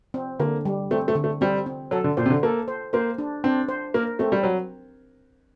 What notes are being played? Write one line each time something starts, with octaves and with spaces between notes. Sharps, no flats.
C4
D3 A#3
G3
A3 C4
A3
D3
A3
G3 C4
C4
F#3 A4
D3
A#2 C5
C3
D3
A#3 A4
C5
A#3 C5
D4
C4 D4
C5
A#3 A#4
A3 C4
G3
F#3